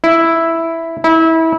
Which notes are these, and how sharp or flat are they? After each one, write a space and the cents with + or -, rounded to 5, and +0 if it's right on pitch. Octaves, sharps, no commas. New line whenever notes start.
E4 +0
E4 -25